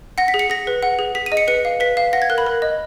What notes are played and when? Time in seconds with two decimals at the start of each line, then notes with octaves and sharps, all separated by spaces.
0.18 F#5 A#6
0.28 B6
0.34 G#4
0.39 C#7
0.50 G#4 A#6
0.67 B4
0.83 F#5
0.99 G#4
1.15 G#4 B6
1.26 D#7
1.32 D#5
1.37 C#7
1.48 B4 C#7
1.65 F5
1.80 B4 B6
1.97 F5
2.13 F#5 A#6
2.22 G#6
2.30 A#4 F#6
2.38 B5
2.47 A#4
2.62 D#5